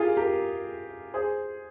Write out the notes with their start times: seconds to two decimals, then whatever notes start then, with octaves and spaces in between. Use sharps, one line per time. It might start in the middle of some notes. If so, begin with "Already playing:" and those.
Already playing: F4 G4 G#4 A#4
0.17 G4 A#4
1.14 G#4 C5